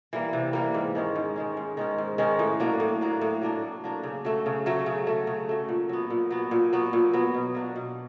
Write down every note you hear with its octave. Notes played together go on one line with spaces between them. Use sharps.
E3 G3 A#3
C3
E3 G3 A#3
G#2
D#3 G#3 C#4
G#2
D#3 G#3 C#4
G#2
D#3 G#3 C#4
G#2
D#3 G#3 C#4
A2
F#3 A#3 D4
A2
F#3 A#3 D4
A2
F#3 A#3 D4
A2
F#3 A#3 D4
C#3
F#3 A3
C#3
F#3 A3
C#3
F#3 A3
C#3
F#3 A3
A#2
F#3 B3
A#2
F#3 B3
A#2
F#3 B3
A#2
F#3 B3
B2
F#3 A#3 D4
B2